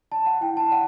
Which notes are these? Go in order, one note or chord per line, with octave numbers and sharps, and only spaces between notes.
D5 A5
F#5
E4 G5
A5
D5 F#5